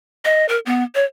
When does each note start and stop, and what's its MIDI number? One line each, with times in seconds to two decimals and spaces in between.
0.25 0.48 75
0.49 0.59 70
0.66 0.84 59
0.95 1.05 73